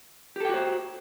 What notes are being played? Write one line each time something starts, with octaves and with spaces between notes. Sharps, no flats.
F#4 G4 A4 C5 G5